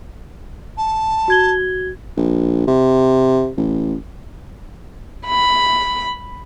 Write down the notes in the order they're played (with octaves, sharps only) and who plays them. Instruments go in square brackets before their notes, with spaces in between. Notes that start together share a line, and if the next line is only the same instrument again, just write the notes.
[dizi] A5
[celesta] F#4 G#6 G7
[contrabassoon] A#1
C3
A1
[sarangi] B5